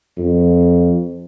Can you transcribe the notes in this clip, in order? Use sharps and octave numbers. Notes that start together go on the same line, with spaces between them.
F2